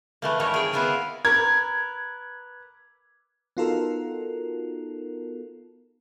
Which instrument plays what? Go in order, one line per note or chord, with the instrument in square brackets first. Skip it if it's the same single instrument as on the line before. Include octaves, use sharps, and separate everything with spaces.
[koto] E3 A3 A#3
D#3 G3 A3 A#4 C#5
G#4 G5
B3 E4 F4 G#4 A#4 G#5
[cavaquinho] A#4 B4 [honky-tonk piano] G#6
[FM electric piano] B3 D#4 F4 F#4 A4 A#4